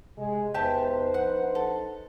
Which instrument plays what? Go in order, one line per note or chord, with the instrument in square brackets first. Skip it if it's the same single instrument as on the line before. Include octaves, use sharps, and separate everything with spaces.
[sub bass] C3 [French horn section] G#3
[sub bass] E2 [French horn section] D#4 B4 C5 [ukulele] G4 E5 A5
[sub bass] A#1 [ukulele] F#5
[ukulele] A4